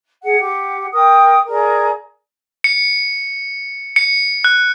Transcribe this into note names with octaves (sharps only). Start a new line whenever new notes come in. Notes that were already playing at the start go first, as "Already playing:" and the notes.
G#4 F#5
G4 F#5
A#4 G5 D#6
G#4 A#4 D5 A#5
C#7
C#7
F#6